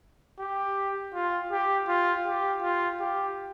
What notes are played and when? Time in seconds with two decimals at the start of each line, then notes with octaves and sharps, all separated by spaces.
0.39 G4
1.14 F4
1.51 G4
1.88 F4
2.26 G4
2.63 F4
3.01 G4